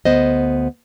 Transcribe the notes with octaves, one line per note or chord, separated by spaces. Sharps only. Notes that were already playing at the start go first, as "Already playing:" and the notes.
D2 B3 C5 D#5